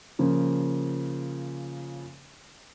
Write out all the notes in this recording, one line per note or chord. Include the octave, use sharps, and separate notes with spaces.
C#3 F3 A#3